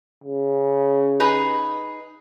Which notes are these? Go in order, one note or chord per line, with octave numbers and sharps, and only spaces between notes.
C#3
D#4 G#4 B4